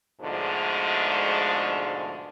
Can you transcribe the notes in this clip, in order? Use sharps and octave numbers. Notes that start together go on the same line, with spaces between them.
G#2 B2 D3 F3 G#3 A3